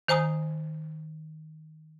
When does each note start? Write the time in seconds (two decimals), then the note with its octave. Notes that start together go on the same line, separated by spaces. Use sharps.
0.08 D#3 C5 G#5 A#5 D#6